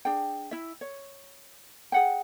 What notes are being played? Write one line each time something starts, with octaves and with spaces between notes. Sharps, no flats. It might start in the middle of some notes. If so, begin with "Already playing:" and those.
D4 G#4 G5
E4 E5
C#5
G#4 F#5 G5